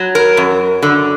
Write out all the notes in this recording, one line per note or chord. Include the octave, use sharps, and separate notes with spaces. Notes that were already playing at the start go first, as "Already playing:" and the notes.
Already playing: F#3
A#4
F#2
D3